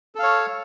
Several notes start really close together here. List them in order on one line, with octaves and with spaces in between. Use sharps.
A4 F5 C#5